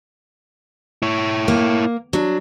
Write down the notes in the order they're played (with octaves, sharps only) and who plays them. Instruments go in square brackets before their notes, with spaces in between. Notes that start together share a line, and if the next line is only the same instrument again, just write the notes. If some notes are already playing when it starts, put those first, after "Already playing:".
[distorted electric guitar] E4 C#5
[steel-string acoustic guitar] A#3
F#3 D4